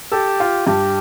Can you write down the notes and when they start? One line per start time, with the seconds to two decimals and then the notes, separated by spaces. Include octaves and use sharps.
0.12 G4 A4
0.40 F4
0.67 G2 G4